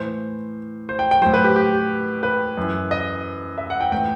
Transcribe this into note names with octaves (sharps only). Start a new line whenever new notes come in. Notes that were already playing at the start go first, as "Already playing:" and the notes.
Already playing: A2 E3 C5
C5
G5
G5
A2 F#3 C5
B4
G4
G4
B4
F#2 E3
D#5
E5
F#5
G5
A2 E3 G5